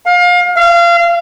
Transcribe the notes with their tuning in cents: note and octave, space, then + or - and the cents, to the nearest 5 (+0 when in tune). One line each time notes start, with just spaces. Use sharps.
F5 +30
F5 -25